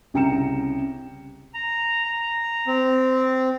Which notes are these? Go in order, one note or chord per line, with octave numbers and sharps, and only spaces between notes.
C2 C#3 G5 A#5 C#7 E7
A#5
A#5
C4